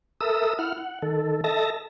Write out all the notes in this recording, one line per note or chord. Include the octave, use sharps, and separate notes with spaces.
A4 A#4 E5 D#6 E6
E4 F#5 F6
F#5
D#3 A4
A4 D#5 E5 A5 A#6